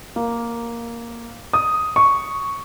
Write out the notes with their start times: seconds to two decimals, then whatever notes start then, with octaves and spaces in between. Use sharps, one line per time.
0.16 A#3
1.53 D#6
1.96 C#6